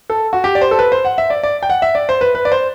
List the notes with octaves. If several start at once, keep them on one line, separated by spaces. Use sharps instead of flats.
A4
F#4
G4
D5
C5
A4
B4
C5
F#5
E5
D5
D5
G5
F#5
E5
D5
C5
B4
B4
D5
C5